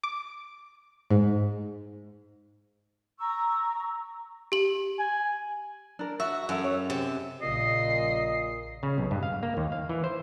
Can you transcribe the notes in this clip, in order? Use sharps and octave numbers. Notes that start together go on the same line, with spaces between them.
D6
G#2
A#5 C#6 E6
G4 F#7
G#5
D4 A#4
F#4 E5
F#2 F#4 A4 E5
C#5
C3
A#1 A#2 C#3 D#5 C7
C#3
B1
G2
F5
A#3
D#2
F5
E3
C5